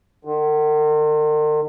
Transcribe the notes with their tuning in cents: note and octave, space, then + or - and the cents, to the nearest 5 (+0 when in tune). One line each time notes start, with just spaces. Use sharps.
D#3 -45